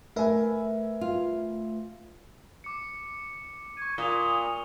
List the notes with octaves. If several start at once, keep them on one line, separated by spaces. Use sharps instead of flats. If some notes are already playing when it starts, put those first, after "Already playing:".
A3 A#4 B4 E5 G#5
F4
D6 C#7
C#6 G#6 D#7
A#2 D#6 F7 G7